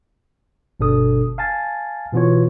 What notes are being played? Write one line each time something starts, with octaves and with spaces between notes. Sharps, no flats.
G1 B2 D4 A4 D#6
F5 G#5 A5 A6
B2 E3 B3 F4 F#4 C#5